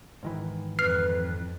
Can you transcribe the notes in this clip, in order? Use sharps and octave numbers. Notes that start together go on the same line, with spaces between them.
G#2 D#3 E3
F2 B4 F6 C7